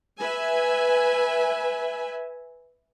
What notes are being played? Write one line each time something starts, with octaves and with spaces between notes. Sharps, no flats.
B4 E5 G#5